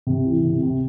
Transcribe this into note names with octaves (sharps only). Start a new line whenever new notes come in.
C3
E3
C3
C3